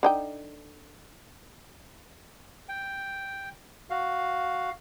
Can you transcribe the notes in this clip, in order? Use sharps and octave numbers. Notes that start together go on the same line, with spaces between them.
D3 D#4 G5
G5
F#4 F5